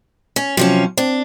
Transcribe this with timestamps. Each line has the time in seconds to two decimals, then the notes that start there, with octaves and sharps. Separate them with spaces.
0.36 C#4
0.57 C3 F3 F#3 C#4
0.98 C4 D4